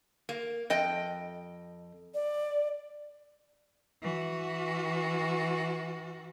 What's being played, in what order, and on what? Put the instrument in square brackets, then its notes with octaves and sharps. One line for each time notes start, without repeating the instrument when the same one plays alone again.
[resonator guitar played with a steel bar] A#3
F2 D#5 G5
[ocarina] D5
[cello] E3 F#4